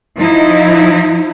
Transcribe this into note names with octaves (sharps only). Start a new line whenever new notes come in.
F3 D#4 E4